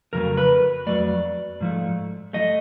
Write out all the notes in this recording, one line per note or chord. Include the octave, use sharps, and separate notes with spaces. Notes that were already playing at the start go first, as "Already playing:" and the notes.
F2 C#3 F#3 A3 A#4
B4
F2 C#3 F#3 A3 D5
G#2 F3 A3
F3 A3 D#5